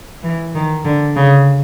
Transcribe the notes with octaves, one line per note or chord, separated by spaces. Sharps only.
E3
D#3
D3
C#3